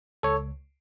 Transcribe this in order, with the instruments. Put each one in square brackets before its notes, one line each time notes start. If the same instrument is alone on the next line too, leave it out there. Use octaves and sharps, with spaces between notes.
[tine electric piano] C#2 A4 C#5